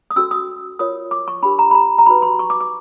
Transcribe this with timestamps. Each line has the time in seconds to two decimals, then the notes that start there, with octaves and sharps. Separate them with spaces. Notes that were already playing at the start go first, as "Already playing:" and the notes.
0.11 D#6
0.16 C#4 F#4 A4 E6
0.31 D#6
0.79 F4 A#4 C#5 D#6
1.11 D6
1.28 C#6
1.43 D4 G4 A#4 B5
1.59 A#5
1.71 B5
1.75 A#5
1.98 A#5
2.06 D#4 F#4 B4 B5
2.22 C6
2.39 C#6
2.50 D6
2.60 D6